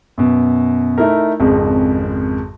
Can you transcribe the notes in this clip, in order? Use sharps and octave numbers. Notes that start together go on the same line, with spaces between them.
F#2 B2
A3 D#4 E4 A4 A#4
G#1 F2 C#3 G#3